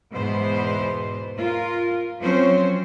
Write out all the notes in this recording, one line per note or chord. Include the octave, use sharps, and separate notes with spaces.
E2 G#2 B2 B3 B4 C5
F4 A#4
F3 F#3 C4 C#4 C5 C#5